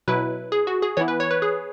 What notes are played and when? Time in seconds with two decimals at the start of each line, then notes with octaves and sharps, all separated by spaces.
0.08 B2 F#3 E4 B4
0.52 G#4
0.67 F#4
0.82 G#4
0.97 E3 B3 E4 C#5
1.08 B4
1.20 C#5
1.31 B4
1.42 G#4